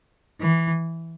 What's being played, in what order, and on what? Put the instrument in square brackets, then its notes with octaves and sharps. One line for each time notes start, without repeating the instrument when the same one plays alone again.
[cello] E3